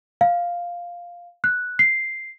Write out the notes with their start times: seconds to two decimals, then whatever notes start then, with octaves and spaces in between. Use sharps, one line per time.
0.21 F5
1.44 F#6
1.79 C7